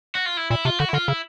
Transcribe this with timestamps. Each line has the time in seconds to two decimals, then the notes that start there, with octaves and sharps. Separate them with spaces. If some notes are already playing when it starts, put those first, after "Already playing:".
0.15 F#4
0.26 F4
0.37 E4
0.50 A#2 E4
0.65 C3 F4
0.79 D3 F#4
0.89 E4
0.93 D3 F4
1.08 C#3 E4